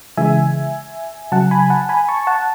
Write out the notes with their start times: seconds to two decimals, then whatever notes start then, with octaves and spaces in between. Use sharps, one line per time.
0.17 C#3 E3 G#3 E5 G#5
1.32 C#3 F#3 F#5 A5
1.51 G#5 B5
1.70 F#5 A5
1.89 G#5 B5
2.09 A5 C#6
2.27 F#5 A5